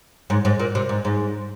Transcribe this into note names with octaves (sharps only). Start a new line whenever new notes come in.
G#2
G#2
A#2
C3
G#2
G#2